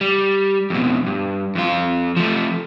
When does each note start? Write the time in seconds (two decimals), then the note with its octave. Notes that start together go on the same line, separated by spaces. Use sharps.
0.01 G3
0.70 F2 B2
1.06 G2
1.55 F2 F4
2.17 F3 A3